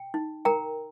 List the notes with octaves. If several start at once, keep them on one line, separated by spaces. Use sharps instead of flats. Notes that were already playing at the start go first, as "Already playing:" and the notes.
Already playing: G5
D#4
A#4 G5 A#5